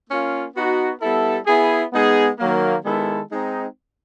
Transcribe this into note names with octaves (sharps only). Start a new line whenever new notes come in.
A#3 C#4 F4
B3 D#4 F#4
G3 B3 E4 A4
B3 E4 G#4
G#3 B3 D#4 G#4
D#3 F#3 A#3
D#3 G#3 B3 E4 A4
G#3 C4 D#4